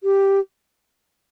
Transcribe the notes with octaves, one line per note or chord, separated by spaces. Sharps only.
G4